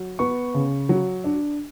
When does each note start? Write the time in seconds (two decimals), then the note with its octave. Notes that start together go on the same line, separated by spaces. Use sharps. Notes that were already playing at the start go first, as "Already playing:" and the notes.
Already playing: F#3
0.19 B3 C#6
0.54 C#3
0.89 F#3
1.24 D4